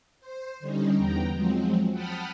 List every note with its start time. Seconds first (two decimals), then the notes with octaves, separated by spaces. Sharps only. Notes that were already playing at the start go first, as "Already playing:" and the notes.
0.20 C5
0.60 D3 G3 C#4 D#4
0.96 E2 B3 G5 A#5
1.33 F3 F#3 G#3 C4
1.91 F#5 G5 A5 B5 D#6 F6